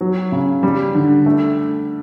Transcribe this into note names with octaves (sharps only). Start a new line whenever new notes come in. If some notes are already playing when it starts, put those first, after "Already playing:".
F#3
C#3
G3
D3
A3